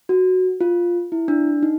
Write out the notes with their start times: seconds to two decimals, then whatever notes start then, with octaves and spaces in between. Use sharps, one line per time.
0.09 F#4
0.61 F4
1.12 E4
1.28 D4
1.63 D#4